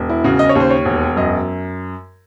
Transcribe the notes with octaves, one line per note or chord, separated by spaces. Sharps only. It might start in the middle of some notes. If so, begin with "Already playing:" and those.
Already playing: E1
E4
C#3 F#4
D#5
C#5
D#2 C5
C#5
E1
F#2 D#5